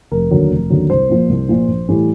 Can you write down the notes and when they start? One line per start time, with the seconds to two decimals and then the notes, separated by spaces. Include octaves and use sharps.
0.12 F1 A#4
0.31 D#2 D3 F#3
0.51 F1
0.70 D#2 D3 F#3
0.90 C2 C5
1.09 A#2 F3 A#3
1.29 C2
1.48 A#2 F3 A#3
1.68 A#1
1.88 A2 E3 G3